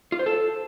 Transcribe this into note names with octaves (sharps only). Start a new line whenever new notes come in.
F4
C5
A4